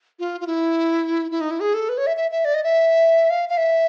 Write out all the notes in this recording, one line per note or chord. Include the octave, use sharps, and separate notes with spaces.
F4
F4
E4
E4
D#4
E4
G#4
A4
B4
C#5
E5
E5
E5
D5
D#5
E5
F5
F5
E5